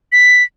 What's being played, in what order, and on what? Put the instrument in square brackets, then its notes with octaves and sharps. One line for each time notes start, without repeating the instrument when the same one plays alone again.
[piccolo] B6